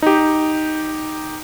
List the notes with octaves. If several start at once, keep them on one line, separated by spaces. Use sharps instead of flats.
D#4 G4